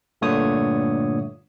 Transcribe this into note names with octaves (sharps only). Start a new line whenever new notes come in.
G2 A#2 D3 A3 C#5 D#6